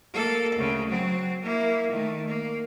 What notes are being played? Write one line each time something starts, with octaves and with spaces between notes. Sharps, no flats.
A#3 A4
D2 C#3
F#3 C4
A#3 E4
D#3 A3
A#3